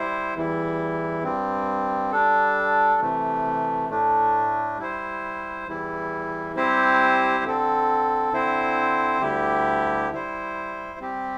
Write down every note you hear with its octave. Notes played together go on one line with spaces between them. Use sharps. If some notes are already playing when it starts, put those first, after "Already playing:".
Already playing: G3 E4 C5
E2 E3 G3 E4
G2 G3 C4
G3 D4 A4
C3 E3 A3
A2 A3 D4
G3 E4 C5
E2 E3 G3 E4
G3 C4 E4 G4 C5
D3 C4 A4
D3 C4 E4 C5
D2 D3 G3 E4 G4
G3 E4 C5
G3 C4 G4